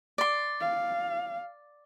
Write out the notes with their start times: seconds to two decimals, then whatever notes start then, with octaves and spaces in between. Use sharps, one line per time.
0.18 D5 C6
0.60 F5